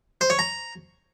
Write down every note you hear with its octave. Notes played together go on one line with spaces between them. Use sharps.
C5
C#5
A#5